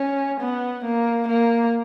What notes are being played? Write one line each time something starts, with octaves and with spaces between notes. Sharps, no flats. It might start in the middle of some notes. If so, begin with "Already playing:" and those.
Already playing: C#4
B3
A#3
A#3